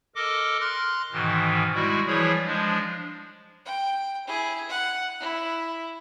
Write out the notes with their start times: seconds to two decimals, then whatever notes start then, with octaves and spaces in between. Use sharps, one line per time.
0.16 A4 A#4 D#5 D6
0.61 C6 F6 F#6
1.12 G#2 B2 D#3 E3
1.74 G3 G#3 E4 F#4
2.07 E3 F3 G3 E4 G#4 C#5
2.45 F3 G#3 D4
3.65 G5
4.27 E4 G#4
4.69 F#5
5.20 E4